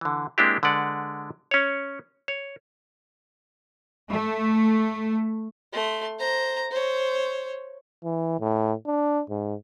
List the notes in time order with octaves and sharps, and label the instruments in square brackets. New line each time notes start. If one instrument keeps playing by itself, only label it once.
[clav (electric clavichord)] D3 E3
G#3 A#3 C4 D4 E4 G4
D3 G#3 B4 D5 F#5
C#4 C#5
C#5
[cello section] A3
[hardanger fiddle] A3 C6
C5 A#5
C5 C#5
[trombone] E3
A2
D4
G#2